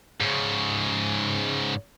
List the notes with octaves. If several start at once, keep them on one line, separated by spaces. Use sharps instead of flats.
G#2 C#3